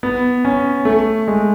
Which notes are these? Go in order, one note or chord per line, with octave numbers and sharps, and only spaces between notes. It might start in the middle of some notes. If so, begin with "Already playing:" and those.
B3
C#4
A3
G#3